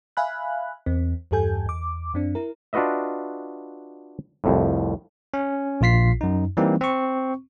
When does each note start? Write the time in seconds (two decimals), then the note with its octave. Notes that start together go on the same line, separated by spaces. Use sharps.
0.17 E5 F5 G#5 B5 F#6
0.86 E2 C4
1.31 E2 G2 G4 A4 G#5 G6
1.66 E2 D6
2.14 F#2 C4 D4
2.35 E4 A#4
2.73 D4 F4 F#4 B4 D#5 E5
4.44 C2 F2 A2
5.34 C#4
5.81 A#1 A#2 F4 B6 C7
6.21 F#2 D#4
6.57 E3 G3 A#3 C4 D#4
6.81 C4 C#6